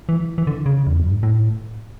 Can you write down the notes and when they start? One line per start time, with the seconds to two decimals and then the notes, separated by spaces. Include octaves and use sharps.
0.09 E3
0.38 E3
0.47 D3
0.66 C#3
0.87 E2
0.99 F#2
1.11 G#2
1.23 A2